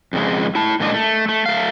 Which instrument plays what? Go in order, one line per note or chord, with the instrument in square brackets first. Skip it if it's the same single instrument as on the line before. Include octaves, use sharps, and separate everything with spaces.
[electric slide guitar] F2 C#3 G#3
E4 A5
A#2 G#3 D4 D#5
A3
A3
A3 F5